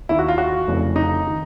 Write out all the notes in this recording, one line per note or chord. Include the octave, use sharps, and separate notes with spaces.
D#2 D#3 E4
F#4
F4
F#4
F1 F2 C#3 E3
D#4
D#3